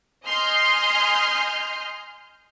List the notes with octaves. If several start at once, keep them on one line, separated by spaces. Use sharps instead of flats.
D#5 G#5 C6 D#6 F6 G6